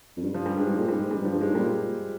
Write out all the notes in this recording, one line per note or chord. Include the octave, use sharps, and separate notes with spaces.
F2
G2
F3
G3
G2 G#3
G#2 G3
A#2 G#3
G#2 G3
G#2
G3
G2
F3
G2
G#2 G#3
A#2 G3
G#3